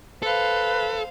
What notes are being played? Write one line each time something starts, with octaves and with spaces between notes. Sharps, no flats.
A4 B4 C5 F5